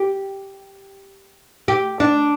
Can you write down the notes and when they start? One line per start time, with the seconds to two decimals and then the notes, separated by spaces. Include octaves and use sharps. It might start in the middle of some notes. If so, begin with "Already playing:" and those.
Already playing: G4
1.68 G4
2.00 D4